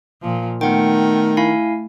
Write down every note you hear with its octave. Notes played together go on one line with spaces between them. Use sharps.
A#2 F3
D#3 A3 B3 F#5 G5
E4 F5 G#5